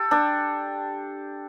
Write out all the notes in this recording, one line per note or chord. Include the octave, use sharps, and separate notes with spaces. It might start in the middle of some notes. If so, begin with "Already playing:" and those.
Already playing: G4 A4
D4